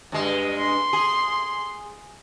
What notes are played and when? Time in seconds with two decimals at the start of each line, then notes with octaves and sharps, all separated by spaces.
0.12 G2 G#3
0.58 C6
0.93 G#4